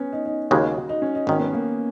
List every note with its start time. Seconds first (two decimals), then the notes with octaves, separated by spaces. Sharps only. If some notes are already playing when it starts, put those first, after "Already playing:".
Already playing: B3 C#4
0.13 D#4
0.26 D#4
0.51 D#2 C#3 G#3 F#4
0.89 D#4
1.02 C#4
1.15 D#4
1.27 G#1 G#2 D#3 G#3 C#4
1.40 B3
1.53 A#3